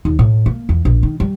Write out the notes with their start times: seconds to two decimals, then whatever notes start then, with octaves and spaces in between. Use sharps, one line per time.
0.05 D#2
0.19 A2
0.46 A#3
0.69 E2
0.85 A#1
1.03 D#3
1.20 G3